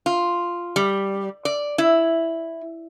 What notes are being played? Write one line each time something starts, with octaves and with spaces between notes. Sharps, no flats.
F4
G3
D5
E4